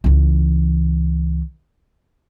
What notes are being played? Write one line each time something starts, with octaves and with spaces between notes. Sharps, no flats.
C#2 E3